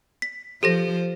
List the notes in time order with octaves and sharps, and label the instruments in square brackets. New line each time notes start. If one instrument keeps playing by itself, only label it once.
[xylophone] B6
[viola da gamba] F3 C5 [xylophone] G4 A4 A#6